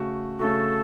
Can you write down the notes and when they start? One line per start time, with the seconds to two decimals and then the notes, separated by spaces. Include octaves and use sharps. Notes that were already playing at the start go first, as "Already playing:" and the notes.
Already playing: C#3 A3 F#4
0.39 C#3 A3 F#4 A4